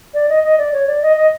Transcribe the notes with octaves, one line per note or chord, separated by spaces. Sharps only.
D5
D#5
D#5
D5
C#5
D5
D#5
D#5